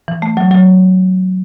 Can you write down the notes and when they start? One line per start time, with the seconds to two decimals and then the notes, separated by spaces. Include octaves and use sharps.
0.08 E3
0.22 A3
0.37 F#3
0.51 F#3